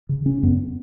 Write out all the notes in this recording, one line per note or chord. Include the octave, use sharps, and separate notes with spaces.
C#3
C#3 C#4
F#2 B3